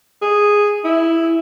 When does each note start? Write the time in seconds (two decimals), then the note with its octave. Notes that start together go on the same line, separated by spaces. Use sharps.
0.22 G#4
0.84 E4